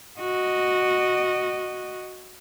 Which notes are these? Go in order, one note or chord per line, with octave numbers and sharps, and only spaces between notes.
F#4 D#5